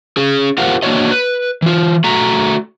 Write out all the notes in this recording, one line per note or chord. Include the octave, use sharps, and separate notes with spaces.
C#4 G#4
F4 G4 A#4 C5 F5 F#5
A#3 B3 D4 F#4 C#5 D#5
B4
E3 F4
A3 F#4 E5 A#5